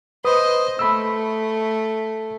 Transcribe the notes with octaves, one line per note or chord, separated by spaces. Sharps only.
B4 C5 D#5 D#6
A3 B5 E6